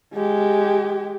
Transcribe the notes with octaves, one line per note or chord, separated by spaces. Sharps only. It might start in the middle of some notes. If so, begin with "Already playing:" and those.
G#3 G4